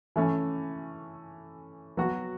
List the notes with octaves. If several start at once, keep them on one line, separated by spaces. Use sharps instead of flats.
E3 A3 C#4
F#3 B3 F#4